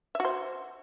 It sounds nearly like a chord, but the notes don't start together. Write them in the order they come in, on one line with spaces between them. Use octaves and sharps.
E5 F#4 C5